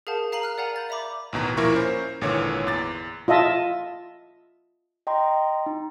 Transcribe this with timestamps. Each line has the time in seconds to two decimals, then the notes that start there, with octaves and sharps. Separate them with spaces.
0.07 G#4 A#4 F5 F#5 A5 G6
0.32 G#4 F5 A#5 C7 D#7 F#7
0.43 F6 F#6
0.57 A#4 D5 F5 F#5 G#5 A#5
0.76 B5 G6 A6
0.89 D5 E5 A#5 B5 D6
1.33 A1 D#2 B2 A#5
1.57 A#2 F3 A#3 E4 A#4 C#6
1.73 C#4 A#4 C5
2.21 G#1 A#2 D3 E3 C#5
2.67 E2 D6 A6
3.28 F4 D#5 E5 A5
5.07 D#5 G5 A#5 C6
5.66 D#4